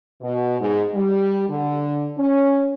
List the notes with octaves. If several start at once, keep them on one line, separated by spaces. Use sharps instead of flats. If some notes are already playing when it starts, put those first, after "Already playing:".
B2
G#2
G3
D3
C#4